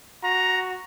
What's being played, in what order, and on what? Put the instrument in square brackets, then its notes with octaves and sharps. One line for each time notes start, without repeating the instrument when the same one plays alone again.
[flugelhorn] F#4 [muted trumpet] A#5